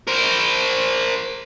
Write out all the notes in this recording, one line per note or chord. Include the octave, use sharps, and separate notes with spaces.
A#4 C5